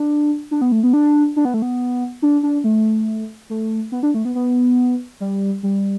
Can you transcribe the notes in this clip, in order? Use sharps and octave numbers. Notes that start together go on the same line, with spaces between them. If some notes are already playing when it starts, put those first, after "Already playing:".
Already playing: D4
D4
B3
A3
B3
D4
D4
B3
A3
B3
D4
D4
A3
A3
B3
D4
A3
B3
B3
G3
G3